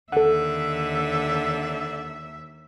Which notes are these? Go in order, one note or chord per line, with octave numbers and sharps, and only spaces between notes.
D#2 D3 A4 E5 F#5